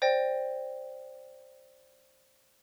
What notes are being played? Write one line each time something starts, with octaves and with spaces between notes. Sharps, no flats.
C5 D5 G5 A#6